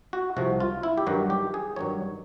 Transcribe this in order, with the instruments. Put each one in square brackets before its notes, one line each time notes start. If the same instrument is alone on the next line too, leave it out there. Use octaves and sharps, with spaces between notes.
[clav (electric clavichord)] F#4
C2 C3 F3 F#4
F4
E4
G4
G2 D#3 F#3 F#4
G4
G#4
G2 D#3 F#3 C#5